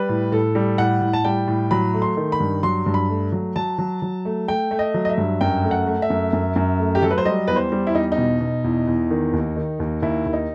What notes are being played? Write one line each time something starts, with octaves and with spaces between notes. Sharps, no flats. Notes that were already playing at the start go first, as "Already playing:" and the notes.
Already playing: G3 B4
A2
A2 A4
G3
A2 F#5
A2
A5
G3 G5
A2
F#3 B5
A3
C6
D#3
B5
G2
F#3 C6
G2
B5
A3
F#3
F#3 A5
F#3
F#3
A3
A3 G5
A3
D#5
F#3
D#5
E5
G2
F#2 G5
A3
F#5
A3
E5
F#2
F#2
F#2
A3
G4
F#3 A4
B4
C5
G3 D#5
E2 B4
C5
G3
E4
E2 D#4
D#4
B2
B2
E2
E2
D#3
D#2
D#3
D#2
D#2 E4
D#2
D#4